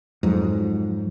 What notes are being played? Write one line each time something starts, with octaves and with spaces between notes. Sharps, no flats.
F2 G#2 F#3